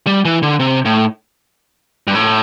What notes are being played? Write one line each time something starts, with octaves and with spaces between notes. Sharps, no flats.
G3
E3
D3
C3
A2
G2
A2